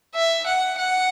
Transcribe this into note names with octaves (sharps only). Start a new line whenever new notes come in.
E5
F#5
F#5